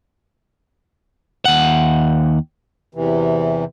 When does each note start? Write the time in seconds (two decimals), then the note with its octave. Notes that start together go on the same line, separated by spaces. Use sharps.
1.45 D#2 F#5
2.95 E2 C3 E3